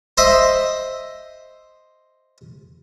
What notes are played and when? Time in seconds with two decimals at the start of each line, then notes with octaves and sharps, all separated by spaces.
0.18 C5 D#5 E5